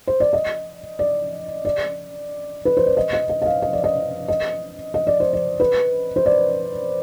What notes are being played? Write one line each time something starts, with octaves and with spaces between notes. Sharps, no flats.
C5
D5
D#5
D5
D5
B4
C5
D5
D#5
D#5
D#5
D#5
F5
D#5
D5
D#5
D#5
D#5
D5
C5
D5
B4
C5
D5